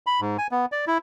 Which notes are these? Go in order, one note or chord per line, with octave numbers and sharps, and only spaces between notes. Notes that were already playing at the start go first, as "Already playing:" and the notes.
B5
G#2
G#5
B3
D5
E4